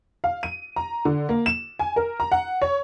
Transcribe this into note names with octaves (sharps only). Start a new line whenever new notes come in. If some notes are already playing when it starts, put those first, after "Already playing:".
F5
D#7
A#5
D3
A#3
E7
G#5
A#4
A#5
F#5
C#5